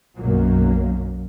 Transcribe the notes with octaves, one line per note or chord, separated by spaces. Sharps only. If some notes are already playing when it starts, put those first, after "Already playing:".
B1 F#2 F#3 A#3